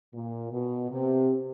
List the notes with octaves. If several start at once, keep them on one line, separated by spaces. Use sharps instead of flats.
A#2
B2
C3